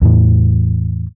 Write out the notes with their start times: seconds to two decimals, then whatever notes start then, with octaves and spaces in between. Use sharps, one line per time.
0.02 E2 A2 E3